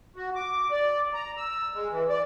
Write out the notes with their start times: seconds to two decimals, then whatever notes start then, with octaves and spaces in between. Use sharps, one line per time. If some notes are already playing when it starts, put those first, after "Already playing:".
0.16 F#4
0.35 D6
0.71 D5
1.14 A#5
1.37 E6
1.74 G#3
1.91 E3
2.09 D5